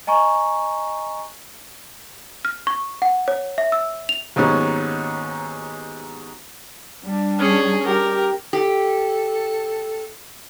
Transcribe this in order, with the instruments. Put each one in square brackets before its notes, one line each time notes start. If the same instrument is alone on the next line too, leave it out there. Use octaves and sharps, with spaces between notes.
[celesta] D#5 G#5 A#5 C#6
[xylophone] F6
C#6
F#5
C#5
E5
E6
F7
[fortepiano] D#2 G#2 F#3 B3 C#4
[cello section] G3 D4
[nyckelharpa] C#4 G#4
[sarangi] G4 [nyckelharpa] A#4
[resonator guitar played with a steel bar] G4 [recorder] A4